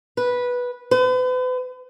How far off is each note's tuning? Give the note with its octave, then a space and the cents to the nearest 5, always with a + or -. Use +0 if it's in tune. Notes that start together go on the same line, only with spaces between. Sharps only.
B4 -10
B4 +40